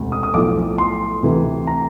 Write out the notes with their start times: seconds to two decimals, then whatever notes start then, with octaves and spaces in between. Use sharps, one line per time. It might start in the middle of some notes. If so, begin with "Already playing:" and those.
Already playing: E1 D2 C3
0.12 D#6
0.23 D#6
0.34 B1 A2 F3 D6
0.78 C6
1.23 D2 C3 E3
1.67 A#5